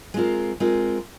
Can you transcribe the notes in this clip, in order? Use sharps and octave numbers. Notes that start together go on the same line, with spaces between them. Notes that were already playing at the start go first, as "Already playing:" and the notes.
G#3 C4 F4 A#4
G#3 C4 F4 A#4